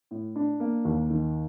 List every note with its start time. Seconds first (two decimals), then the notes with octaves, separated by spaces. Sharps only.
0.11 A2
0.36 D4
0.60 A#3
0.85 D#2
1.10 D#3